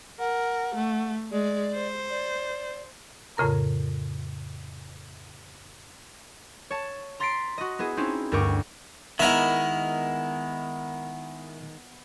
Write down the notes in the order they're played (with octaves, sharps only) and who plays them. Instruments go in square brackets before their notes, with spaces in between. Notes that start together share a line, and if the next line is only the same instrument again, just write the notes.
[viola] A#4 [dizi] F#5
[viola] A3
[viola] G#3 [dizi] D5
[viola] C5
[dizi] D5
[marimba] F2 A2 C#3 A#4 A#5
[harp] C#5 A5
A#5 C6 A6 B6 C7 D7
F#4 D#5
B3 E4 G#4
C4 C#4 D#4 E4
D2 G2 A#4 G5 C#6 D6
[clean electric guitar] D#3 G#3 [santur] B3 B4 F#5 [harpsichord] E4 A#4 E5